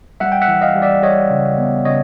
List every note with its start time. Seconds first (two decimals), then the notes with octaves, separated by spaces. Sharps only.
0.20 G3 E5 F#5
0.32 G5
0.41 E5 F#5
0.48 E3
0.61 D#5 F5
0.75 G3
0.82 D5 E5
1.03 G3 C#5 D#5
1.30 C#3
1.58 B3
1.85 C#3 C#5 D#5